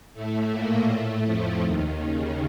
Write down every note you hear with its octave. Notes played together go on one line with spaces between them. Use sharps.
A2 A3
A#2 A#3
A2 A3
F2 F3
D#2 D#3
C#3